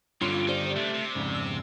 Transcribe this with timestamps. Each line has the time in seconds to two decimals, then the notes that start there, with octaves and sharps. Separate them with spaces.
0.21 G2 D3 F#3 G3 C#4 F4 C6
0.48 D#3 D#4 G4 C5 D5
0.76 C3 A3 D4
0.94 C3
1.15 F2 G#2 C#3
1.34 E6